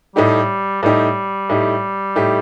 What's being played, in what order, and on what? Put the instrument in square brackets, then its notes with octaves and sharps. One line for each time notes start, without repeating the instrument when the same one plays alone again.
[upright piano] A2 A3 D#4 G4 [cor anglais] G3
[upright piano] A2 A3 D#4 G4 [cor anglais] G3
[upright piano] A2 A3 D#4 G4
A2 A3 D#4 G4